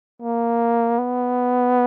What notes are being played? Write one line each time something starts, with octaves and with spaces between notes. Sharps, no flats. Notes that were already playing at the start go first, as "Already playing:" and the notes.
A#3
B3